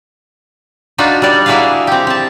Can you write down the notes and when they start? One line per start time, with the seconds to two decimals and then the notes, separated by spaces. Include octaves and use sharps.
0.98 D4 D#4 F4 F#4 B4
1.22 G3 D5
1.46 A#3 E4 F#4 G#4 B4 F5
1.87 C4 G4
2.07 C4 A5